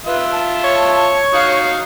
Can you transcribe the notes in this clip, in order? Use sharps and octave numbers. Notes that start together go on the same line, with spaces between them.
F4 B4 E5
A5
C#5
D#4 F#4 F5